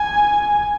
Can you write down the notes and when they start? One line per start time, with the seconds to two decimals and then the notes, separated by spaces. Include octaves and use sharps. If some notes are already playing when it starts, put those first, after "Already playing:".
Already playing: G#5